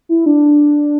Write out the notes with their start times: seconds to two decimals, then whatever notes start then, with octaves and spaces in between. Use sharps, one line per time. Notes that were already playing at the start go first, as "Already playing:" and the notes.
0.09 E4
0.26 D4